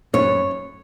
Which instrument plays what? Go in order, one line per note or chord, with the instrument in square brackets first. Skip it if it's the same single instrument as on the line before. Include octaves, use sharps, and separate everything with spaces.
[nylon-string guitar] F#2 C#5